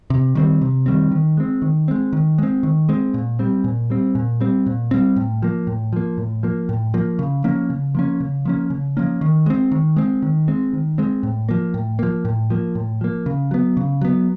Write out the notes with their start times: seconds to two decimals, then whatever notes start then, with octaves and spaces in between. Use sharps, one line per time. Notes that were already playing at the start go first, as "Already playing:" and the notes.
0.10 C3
0.35 D#3 G3 C4
0.61 C3
0.86 D#3 G3 C4
1.11 D#3
1.37 G#3 C4
1.62 D#3
1.88 G#3 C4
2.13 D#3
2.38 G#3 C4
2.63 D#3
2.89 G#3 C4
3.14 A#2
3.39 G3 C4
3.64 A#2
3.90 G3 C4
4.15 A#2
4.40 G3 C4
4.66 A#2
4.91 G3 C4
5.16 A2
5.42 F3 A#3
5.67 A2
5.93 F3 A#3
6.18 A2
6.43 F3 A#3
6.69 A2
6.94 F3 A#3
7.19 C#3
7.44 F3 A#3 C#4
7.70 C#3
7.95 F3 A#3 C#4
8.20 C#3
8.45 F3 A#3 C#4
8.70 C#3
8.97 F3 A#3 C#4
9.21 D#3
9.46 G#3 C4
9.72 D#3
9.97 G#3 C4
10.22 D#3
10.48 G#3 C4
10.73 D#3
10.98 G#3 C4
11.23 A2
11.49 F3 A#3
11.74 A2
11.99 F3 A#3
12.25 A2
12.50 F3 A#3
12.75 A2
13.01 F3 A#3
13.26 C#3
13.51 F#3 B3
13.77 C#3
14.01 F#3 B3